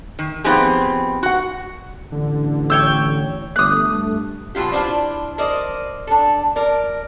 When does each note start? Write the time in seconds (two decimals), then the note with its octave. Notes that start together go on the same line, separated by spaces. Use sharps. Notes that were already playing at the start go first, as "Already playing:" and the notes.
0.19 D#3
0.44 F3 B3 C4 D#4 G4 G#4
1.23 F#4 F#5
2.12 A1 D3
2.70 C#5 G5 E6
3.56 G1 A3 D#6 F#6
3.93 G2
4.55 B2 F#3 F4 G4
4.72 D4 E4 F4 C5 D5
5.38 A#4 C5 D5 D#5
6.07 D4 A4
6.56 A#4 D5